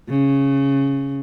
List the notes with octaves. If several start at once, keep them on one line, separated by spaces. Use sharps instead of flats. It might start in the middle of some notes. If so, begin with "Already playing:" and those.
C#3